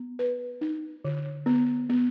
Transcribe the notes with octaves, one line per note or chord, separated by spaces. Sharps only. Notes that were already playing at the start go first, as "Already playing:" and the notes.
Already playing: B3
B4
D#4
D3
B3
B3